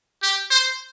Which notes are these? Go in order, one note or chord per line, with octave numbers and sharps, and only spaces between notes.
G4
C5